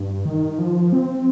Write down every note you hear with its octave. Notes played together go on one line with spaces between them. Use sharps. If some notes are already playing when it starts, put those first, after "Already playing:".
Already playing: G2
D#3
F3
C4